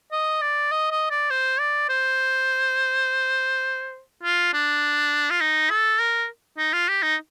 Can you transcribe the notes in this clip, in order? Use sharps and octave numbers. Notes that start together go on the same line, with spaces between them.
D#5
D5
D#5
D#5
D5
C5
D5
C5
F4
D4
F4
D#4
A4
A#4
D#4
F4
G4
D#4